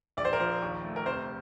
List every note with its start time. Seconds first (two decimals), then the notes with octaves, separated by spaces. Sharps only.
0.17 A#1 D5
0.25 C5
0.33 A#4
0.40 F3 C5
0.62 D#2
0.84 A3
0.96 A#4
1.06 F1 C5